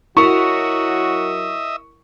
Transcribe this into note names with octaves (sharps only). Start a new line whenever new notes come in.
F#3 E4 F#4 A#4 D#5 E5 C#6